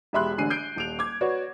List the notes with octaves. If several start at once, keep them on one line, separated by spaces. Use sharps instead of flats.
E1 G4 E5 B5 C6 F#6
A1 D3 G#5 C7 D#7
G6 C7 D7
D#1 D7 F7
D6 G#6
F#4 B4 C#5 D5